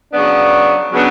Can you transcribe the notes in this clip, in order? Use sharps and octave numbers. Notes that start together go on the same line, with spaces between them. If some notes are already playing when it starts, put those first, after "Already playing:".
C#3 F#3 B3 D4
C#3 F#3 B3 D4